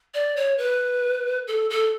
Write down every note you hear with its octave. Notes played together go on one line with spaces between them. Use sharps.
D5
C#5
B4
A4
A4